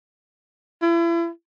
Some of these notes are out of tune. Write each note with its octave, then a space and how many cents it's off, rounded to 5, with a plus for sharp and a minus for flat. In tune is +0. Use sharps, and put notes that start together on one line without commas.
E4 +40